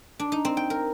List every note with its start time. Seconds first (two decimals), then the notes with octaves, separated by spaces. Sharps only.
0.19 D4
0.32 D#4
0.45 C4
0.57 G5
0.70 A#4